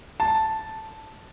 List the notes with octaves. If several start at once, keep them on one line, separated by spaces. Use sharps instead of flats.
A5